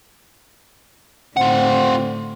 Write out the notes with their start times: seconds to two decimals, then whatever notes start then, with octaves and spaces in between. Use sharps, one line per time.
1.37 A2 D3 C4 F4 F#5